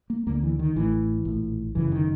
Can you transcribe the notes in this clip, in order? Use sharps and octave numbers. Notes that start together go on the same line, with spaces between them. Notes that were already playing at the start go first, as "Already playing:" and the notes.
A#3
D2 D3 A#3
E3
D#3
A1 A2 E3
A#1 A2
G1 F#2 C#3 E3
D#3